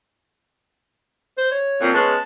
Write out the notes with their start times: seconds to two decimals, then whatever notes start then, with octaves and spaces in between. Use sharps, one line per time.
1.38 C5
1.52 C#5
1.81 F2 A#2
1.94 G#3 B3 C#4 A5